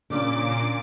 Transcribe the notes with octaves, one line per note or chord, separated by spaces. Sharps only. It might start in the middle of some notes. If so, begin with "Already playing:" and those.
A#2 C#3 C#4 D4 D6